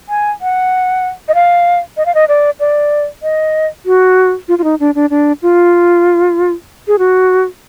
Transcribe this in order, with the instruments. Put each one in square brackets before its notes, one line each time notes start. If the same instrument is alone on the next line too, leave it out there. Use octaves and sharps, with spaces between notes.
[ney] G#5
F#5
D#5
F5
D#5
F5
D#5
D5
D5
D#5
F#4
F4
F4
D#4
D4
D4
D4
F4
G#4
F#4